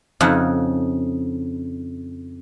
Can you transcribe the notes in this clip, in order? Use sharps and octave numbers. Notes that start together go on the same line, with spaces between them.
F2 C#3 D#4 F#5